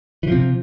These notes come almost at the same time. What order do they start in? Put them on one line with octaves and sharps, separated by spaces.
E3 F3 C3